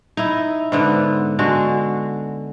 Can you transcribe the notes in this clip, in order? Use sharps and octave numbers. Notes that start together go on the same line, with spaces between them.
D#4 E4
G#2 D3 B3
D3 G#3 F#4